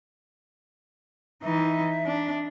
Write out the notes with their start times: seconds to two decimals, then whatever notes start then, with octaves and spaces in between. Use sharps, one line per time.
1.43 E3 D#4 E5
2.06 D4